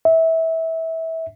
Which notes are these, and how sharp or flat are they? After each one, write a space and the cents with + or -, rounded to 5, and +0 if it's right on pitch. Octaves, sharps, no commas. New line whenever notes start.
E5 -20